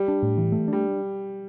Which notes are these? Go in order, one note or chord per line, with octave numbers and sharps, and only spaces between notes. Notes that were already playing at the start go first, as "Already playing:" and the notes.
Already playing: G3
D4
A2
E3
A3
G3 D4